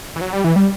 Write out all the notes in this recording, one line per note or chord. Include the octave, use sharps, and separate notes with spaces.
E3
F#3
G3
E3
G3